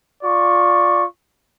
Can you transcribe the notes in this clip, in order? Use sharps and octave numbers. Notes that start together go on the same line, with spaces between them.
F4 D5 C#6